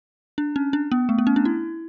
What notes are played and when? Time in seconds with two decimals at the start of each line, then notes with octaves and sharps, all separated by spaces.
0.38 D4
0.56 C#4
0.73 D4
0.92 B3
1.09 A3
1.18 B3
1.27 C#4
1.36 D4
1.45 E4